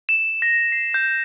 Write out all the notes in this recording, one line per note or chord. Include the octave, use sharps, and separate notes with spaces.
E7
A#6
C7
G6